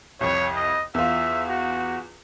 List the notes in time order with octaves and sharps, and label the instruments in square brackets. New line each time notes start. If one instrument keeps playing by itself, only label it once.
[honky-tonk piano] C2 F2 [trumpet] C#5
[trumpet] D#5
[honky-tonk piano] E2 F4 [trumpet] E5
[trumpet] F#4